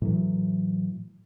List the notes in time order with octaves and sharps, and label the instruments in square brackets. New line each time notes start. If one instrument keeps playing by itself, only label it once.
[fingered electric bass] A2 E3 F#3